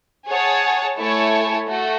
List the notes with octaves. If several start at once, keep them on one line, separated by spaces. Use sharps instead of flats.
G#4 C#5 F#5 A5
A3 E4 A4 C#5 G#5
A3 F#4